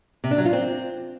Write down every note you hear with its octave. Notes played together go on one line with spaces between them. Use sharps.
C3
D4
F#3
F4
C4